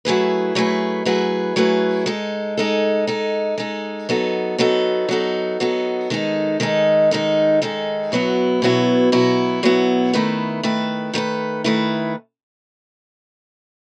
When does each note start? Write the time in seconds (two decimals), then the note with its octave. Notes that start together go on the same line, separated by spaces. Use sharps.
0.05 F#3 A3 E4 G#4 B4
0.55 F#3 A3 E4 G#4 B4
1.05 F#3 A3 E4 G#4 B4
1.56 F#3 A3 E4 G#4 B4
2.06 G#3 D#4 A4
2.57 G#3 D#4 A4
3.07 G#3 D#4 A4
3.58 G#3 D#4 A4
4.09 F#3 B3 D#4 A4
4.58 F#3 B3 D#4 A4
5.09 F#3 B3 D#4 A4
5.60 F#3 B3 D#4 A4
6.10 D#3 G#3 D#4 A4
6.60 D#3 G#3 D#4 A4
7.11 D#3 G#3 D#4 A4
7.62 D#3 G#3 D#4 A4
8.12 B2 F#3 B3 E4
8.62 B2 F#3 B3 E4
9.12 B2 F#3 B3 E4
9.63 B2 F#3 B3 E4
10.13 D#3 A3 E4 B4
10.63 D#3 A3 E4 B4
11.14 D#3 A3 E4 B4
11.64 D#3 A3 E4 B4